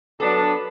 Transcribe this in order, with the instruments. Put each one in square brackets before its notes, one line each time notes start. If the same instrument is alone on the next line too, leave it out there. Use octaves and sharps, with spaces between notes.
[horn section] F#3 B3 D4 [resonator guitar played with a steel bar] A4
[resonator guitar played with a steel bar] B4